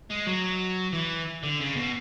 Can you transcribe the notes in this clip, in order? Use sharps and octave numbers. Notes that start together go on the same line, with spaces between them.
G#3
F#3
E3
D3
C#3
B2